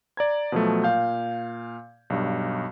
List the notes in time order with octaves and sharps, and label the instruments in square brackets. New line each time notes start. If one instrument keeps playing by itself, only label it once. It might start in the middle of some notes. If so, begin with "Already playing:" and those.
[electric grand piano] D5 A#5 G#6
B2 F3 F#3 A3
A#2 F5 G6
B1 G2